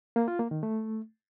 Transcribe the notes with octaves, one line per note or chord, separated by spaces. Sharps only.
A#3
F4
A#3
D#3
A3